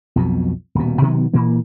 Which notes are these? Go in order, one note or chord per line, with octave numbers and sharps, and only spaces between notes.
B1 F2 B2
D#1 B2
B2 D#3 F#3 B3
A#2 E3 A#3